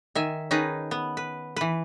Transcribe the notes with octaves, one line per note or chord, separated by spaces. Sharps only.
D#3 E5 G#5
D#3 C#4 D#4 G#4 B4
B3
B4
E3 B4